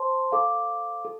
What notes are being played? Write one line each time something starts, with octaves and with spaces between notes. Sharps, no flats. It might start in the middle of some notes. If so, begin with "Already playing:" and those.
Already playing: C5 A5 C6
A4 F5 D6
A4